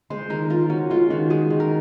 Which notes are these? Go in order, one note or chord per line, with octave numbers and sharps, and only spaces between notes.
G#3 C5
D#3 A#4
F4 A#4
C#4 F#4
G#3 F4
D#3 F#4
G#3 G#4
D#3
A#4